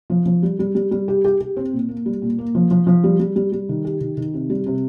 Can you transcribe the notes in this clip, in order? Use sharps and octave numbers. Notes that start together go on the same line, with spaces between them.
F3
F3
G3
G3
G3
G3
G4
G4
G4
C4
A#2
A#3
G3
A#2
A#3
F3
F3
F3
G3
G3
G3
G3
D#3
G4
D#3
D#3
C3
G3
C3